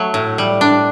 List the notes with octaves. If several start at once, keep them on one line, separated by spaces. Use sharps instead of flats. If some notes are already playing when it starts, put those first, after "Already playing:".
Already playing: F#3 A3
A2
G3
D4